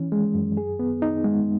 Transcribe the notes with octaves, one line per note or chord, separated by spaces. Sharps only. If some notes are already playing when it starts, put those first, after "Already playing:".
Already playing: E3 C#4
G#3
F#2
G#4
B3
D#4
G#3